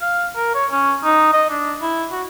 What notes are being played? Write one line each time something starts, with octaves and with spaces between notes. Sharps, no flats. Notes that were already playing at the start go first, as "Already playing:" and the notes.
F5
A#4
C#5
C#4
D#4
D#5
D4
E4
F#4